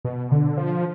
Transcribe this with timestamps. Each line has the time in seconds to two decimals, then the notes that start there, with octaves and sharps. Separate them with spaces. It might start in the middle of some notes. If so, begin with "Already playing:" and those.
0.05 B2
0.31 D3
0.57 F3